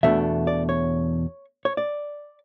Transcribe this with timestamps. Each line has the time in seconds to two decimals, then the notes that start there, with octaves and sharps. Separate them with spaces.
0.03 E2 B2 A3 D4 E5
0.47 D5
0.69 C#5
1.65 C#5
1.77 D5